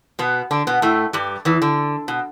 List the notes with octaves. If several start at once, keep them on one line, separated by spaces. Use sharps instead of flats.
B2 B3
D3 D4
B2 B3
A2 A3
G2 G3
E2 E3
D3
B2